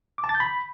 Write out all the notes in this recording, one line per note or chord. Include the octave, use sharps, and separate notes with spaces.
D6
A5
A6
G6
B5